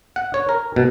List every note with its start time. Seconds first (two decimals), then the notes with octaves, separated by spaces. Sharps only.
0.16 F#5
0.34 C#5
0.49 A#4
0.76 B2